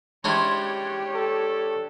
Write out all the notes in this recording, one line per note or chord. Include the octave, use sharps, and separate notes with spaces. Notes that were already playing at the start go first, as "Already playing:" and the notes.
G#3 C#4 D4 E4 G4 C5 C#5
A4